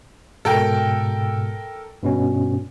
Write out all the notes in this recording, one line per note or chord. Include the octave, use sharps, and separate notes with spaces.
G#2 B2 A4 A#4 G5
G2 B2 C#4